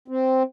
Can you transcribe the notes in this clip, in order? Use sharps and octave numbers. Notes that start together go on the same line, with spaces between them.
C4